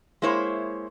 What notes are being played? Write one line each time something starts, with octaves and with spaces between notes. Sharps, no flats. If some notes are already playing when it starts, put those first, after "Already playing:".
G#3 A#3 E4 C5 C#5